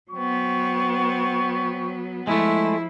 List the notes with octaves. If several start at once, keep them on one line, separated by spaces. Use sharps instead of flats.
F#3 B3 C4 C#6
F3 G#3 A3 E4